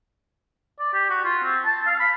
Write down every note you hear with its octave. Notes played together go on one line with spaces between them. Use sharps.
D5
G4
F#4
F4
C4
A5
F5
B5